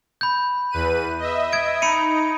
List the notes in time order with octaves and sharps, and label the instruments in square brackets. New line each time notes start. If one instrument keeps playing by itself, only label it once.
[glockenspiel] B5 G6
[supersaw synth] E2 B4 D#7
D#5 E5
[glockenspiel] G#6 D7
[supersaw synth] D#4 [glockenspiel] B5 C#7 D#7